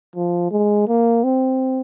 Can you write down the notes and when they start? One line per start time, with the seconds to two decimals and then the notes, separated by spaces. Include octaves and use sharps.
0.16 F3
0.51 G#3
0.87 A#3
1.24 C4